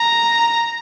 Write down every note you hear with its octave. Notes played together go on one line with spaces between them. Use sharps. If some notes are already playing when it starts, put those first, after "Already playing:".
Already playing: A#5